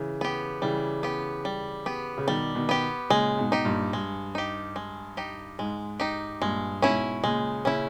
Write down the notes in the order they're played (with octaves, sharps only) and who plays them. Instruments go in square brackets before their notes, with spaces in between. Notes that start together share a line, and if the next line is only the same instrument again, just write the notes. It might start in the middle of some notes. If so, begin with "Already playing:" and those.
Already playing: [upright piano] C#3 E3
[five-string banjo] B3 G4
[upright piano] C#3 E3 [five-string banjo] G3
[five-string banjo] B3 G4
G3
B3 G4
[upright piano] C#3
[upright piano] B2 D#3 [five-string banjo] G3
[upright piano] B2 D#3
[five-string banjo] B3 G4
[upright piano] A#2 C#3 [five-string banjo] G#3
[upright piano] G#2 B2
[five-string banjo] D#4 G4
[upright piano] G2 A#2
[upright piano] G2 [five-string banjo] G#3
[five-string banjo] D#4 G4
G#3
D#4 G4
[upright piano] G#2 [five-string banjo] G#3
[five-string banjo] D#4 G4
[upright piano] G2 A#2 [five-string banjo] G#3
[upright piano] G#2 B2 [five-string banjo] C#4 E4
[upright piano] A#2 C#3 [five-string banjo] G#3
[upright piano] A#2 C#3 [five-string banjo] C#4 E4